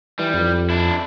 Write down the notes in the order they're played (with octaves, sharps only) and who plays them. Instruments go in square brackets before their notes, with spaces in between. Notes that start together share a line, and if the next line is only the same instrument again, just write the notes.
[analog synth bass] E3 [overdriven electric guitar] G3
[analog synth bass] F2
[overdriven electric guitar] D4 E4